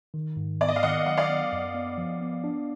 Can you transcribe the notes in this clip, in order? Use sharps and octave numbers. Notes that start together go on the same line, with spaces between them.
D#3
G#2
B3 D5
D#5
F5
D#3 D#5 F#5
F#3 F#5
D5 F5
B3
F#2
B3
F3
B3
D4